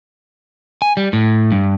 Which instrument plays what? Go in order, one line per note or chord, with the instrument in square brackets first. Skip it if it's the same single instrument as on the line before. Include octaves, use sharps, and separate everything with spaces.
[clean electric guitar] G#5
G3
A2
G2